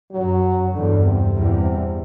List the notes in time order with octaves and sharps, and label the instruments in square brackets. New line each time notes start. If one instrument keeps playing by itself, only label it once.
[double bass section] F#2 [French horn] F#3
[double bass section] E2 G2 [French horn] D3
[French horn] C3
[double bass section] E2 G2